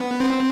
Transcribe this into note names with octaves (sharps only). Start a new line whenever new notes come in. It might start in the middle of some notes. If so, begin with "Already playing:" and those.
Already playing: B3
C4